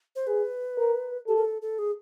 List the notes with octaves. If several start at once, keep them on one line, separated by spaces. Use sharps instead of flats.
C5
G#4 B4
A#4
G4 A4
A#4
A4
A4
G#4